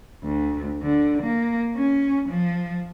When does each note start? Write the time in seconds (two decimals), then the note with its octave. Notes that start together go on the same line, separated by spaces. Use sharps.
0.23 D2
0.83 D3
1.23 A#3
1.76 C#4
2.29 F3